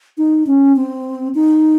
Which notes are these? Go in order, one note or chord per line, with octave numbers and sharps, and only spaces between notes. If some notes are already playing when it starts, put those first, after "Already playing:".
D#4
C#4
C4
D#4